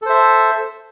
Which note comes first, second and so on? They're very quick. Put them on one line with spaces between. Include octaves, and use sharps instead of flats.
A4 C5 E5